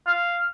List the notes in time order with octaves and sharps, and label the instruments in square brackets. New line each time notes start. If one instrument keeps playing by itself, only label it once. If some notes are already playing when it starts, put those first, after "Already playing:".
[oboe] F5